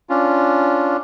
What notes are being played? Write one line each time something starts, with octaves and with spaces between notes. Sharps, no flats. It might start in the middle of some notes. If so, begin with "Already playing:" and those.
C#4 D4 F4